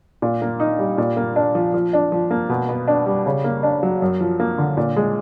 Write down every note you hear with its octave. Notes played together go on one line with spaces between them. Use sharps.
A#2
A#3
D#4
G3
A#2
A#3
D4
F3
F3
D4
F3
A#3
B2
B3
D4
G3
C#3
A#3
D4
F#3
F#2
F3
A#3
D3
A#2
G#3